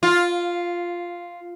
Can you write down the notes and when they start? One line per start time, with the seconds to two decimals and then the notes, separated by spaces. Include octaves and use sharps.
0.03 F4